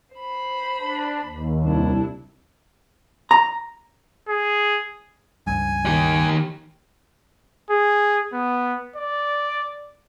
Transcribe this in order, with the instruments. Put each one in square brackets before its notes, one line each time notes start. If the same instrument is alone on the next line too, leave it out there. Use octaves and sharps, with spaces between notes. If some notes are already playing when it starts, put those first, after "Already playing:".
[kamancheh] C5 B5
[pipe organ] D4
D#2
[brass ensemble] C2 [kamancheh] D4 E4
[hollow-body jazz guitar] A#5
[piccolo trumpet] G#4
[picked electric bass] C#2 G2 [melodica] G#5
[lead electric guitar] D#3 G4
[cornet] G#4
B3
D5